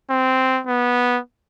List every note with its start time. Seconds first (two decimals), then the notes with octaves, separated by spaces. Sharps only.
0.10 C4
0.67 B3